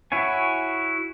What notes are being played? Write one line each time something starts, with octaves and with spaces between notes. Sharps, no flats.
E4 F#4 C#5 G#5